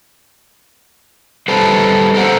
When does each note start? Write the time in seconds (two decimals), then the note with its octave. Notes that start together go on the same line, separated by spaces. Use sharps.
1.48 G3 A4 B4 C5
2.14 A4 A#4 C5 F#5